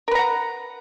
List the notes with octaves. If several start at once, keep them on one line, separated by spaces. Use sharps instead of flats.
A#4 B4 F#5 A#5